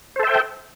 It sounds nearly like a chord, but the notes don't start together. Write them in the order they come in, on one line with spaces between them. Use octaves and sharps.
C5 A4 E5 G5